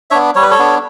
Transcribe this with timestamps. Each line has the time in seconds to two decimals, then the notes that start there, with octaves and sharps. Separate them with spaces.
0.11 B3 D4 C#5 E5
0.35 G3 C#5
0.43 B4
0.51 A4 C#5
0.59 B3 D4